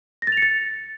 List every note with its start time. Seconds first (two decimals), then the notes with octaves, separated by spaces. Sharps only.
0.22 A#6
0.27 A6
0.32 F7
0.37 C#7
0.42 A6